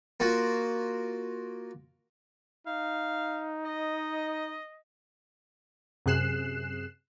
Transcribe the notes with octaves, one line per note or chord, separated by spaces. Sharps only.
A#3 F4 F#4
D#4 F5
D#5
F#2 C3 G#4 F#6 C7 E7